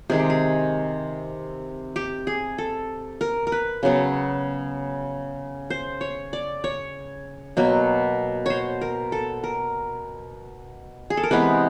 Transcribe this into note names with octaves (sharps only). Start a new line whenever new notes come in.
C3 D#3 G#3 G#4
G4
G#4
G4
G#4
A4
A#4
A#4
B4
C#3 F#3 B3
C5
C#5
D5
C#5
B2 F#3 A#3
C5 C#5
A#4
A4
A#4
G#4
A4
A#4
C3 E3 G#3 B3 B4